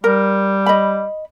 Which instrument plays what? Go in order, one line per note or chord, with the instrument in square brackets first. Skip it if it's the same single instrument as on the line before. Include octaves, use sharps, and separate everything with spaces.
[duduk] G3 [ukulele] A#4
[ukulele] D#5 B5